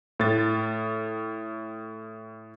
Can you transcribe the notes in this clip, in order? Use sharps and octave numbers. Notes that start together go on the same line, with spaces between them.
A2 A6